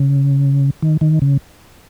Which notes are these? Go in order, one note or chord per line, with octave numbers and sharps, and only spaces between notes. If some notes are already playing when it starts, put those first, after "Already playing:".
Already playing: C#3
D#3
D#3
C#3